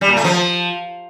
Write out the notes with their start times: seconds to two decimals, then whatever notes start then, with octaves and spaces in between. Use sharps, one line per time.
0.01 G3
0.09 A#2
0.17 A3
0.24 F3